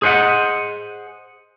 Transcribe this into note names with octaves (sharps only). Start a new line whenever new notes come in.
G#4 C5 D#5 F#5